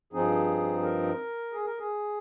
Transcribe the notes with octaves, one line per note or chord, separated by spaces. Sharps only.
G2 F3 C4 D#4 G#4
G#4
A#4
G#4
A#4
G#4